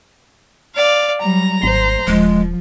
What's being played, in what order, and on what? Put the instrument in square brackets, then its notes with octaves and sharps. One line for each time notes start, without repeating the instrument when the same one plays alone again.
[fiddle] D5 F5
[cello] F#3 G3 [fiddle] A#5
[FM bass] G#1 [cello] C5
[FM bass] D#1 [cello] F3 [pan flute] G#3